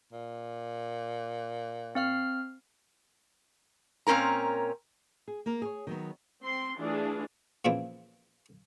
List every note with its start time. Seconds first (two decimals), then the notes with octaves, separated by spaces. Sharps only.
0.12 A#2
1.95 C4 F5 F6
4.07 A#2 C4 C#4 A#4 A#5
5.28 G#4
5.46 A#3 A#4
5.62 G#4 C#5
5.87 D#3 F#3 B3
6.41 C4 C6
6.77 E3 A3 D4 F4 G#4
7.65 A#2 C#3 E3 F3 C4 E4